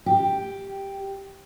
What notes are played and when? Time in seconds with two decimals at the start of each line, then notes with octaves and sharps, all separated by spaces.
0.06 G4